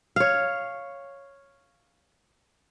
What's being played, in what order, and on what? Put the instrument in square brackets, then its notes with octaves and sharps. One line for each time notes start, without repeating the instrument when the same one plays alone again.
[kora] C#5 F5